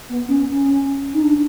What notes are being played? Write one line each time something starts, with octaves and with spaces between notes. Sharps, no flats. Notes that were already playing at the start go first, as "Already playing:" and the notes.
B3
C#4
C#4
D#4
D4